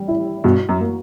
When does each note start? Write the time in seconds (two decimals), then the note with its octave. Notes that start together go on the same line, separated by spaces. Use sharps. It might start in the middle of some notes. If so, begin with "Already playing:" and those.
Already playing: G3
0.08 E4
0.44 G2 B2 F#4
0.69 F#2
0.80 A#3